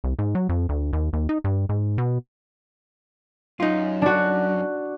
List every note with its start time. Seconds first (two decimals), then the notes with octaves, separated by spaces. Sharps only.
0.04 C2
0.19 G#2
0.35 F#3
0.49 F2
0.69 D2
0.93 D#2
1.13 D#2
1.29 D#4
1.44 G2
1.69 G#2
1.98 B2
3.60 F#2 D#4 F4
4.02 D4 F#4